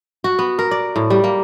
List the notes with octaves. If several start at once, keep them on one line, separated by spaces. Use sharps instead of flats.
F#4
B3
A#4
D5
A2
G3
A#3